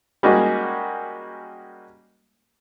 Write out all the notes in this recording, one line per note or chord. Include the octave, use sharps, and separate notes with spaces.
G3 G#3 A#3 C#4 D#4 F#4